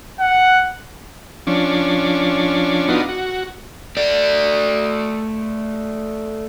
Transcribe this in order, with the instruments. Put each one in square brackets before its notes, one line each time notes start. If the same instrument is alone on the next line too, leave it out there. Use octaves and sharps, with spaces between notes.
[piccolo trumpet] F#5
[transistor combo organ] F3 C#4 D4
B3 D4 D#4 F4 F#4
F#4
[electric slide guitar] A3 D5